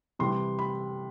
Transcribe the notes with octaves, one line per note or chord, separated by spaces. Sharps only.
C3 E3 G3 C6
B5